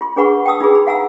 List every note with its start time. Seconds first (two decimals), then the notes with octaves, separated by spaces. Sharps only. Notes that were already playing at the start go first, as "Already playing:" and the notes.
0.01 F4 C6
0.16 D4 G#4 B4 F#5 B5 C#6
0.45 G5 A5 D#6 E6
0.60 D#4 F4 F#4 G#4 B4
0.75 B5
0.87 F5 F#5 G#5 A#5 E6